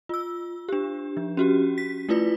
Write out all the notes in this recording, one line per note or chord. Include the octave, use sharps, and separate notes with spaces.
F4 E6
D4 G4
F3
C#4 F#4 G4
B6
A3 E4 F4 B4 D5